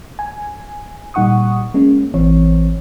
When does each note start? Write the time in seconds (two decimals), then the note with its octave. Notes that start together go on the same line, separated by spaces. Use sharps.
0.19 G#5
1.14 A#2 G3 D#4 F#5 C#6 D#6
1.74 G#3 A#3 C#4
2.14 A1 E3 C4 C#5